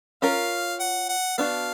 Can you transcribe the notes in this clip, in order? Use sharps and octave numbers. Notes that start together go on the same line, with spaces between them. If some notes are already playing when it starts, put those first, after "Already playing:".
C#4 F4 A#4 F5
F#5
F#5
B3 D4 F#4 F5